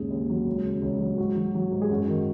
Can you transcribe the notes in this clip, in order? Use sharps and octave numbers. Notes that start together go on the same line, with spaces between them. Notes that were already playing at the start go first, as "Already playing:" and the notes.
Already playing: D#2 G#2 C#3 G#4
D#2
F#3
C#2
C#3
C#2
F#3
G#2 F#4
F#3
F#3
G#2
G#4
F#2 F#4
D#3